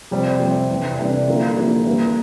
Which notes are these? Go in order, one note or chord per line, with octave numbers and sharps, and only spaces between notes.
F2 C3 G3 C4
F2 C3 G3 C4
C3 E3 G3 D4
C3 E3 G3 D4
D3 F3 A#3 E4 G4
D3 F3 A#3 E4 G4
G2 E3 A#3